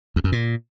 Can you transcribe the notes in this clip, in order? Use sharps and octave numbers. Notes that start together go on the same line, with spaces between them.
E2
F#2
A#2